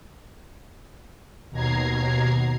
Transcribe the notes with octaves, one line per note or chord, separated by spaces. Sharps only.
D#2 B2 A#5 G#6 C7